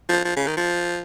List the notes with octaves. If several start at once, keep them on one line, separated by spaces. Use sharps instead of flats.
F3
F3
C#3
D#3
F3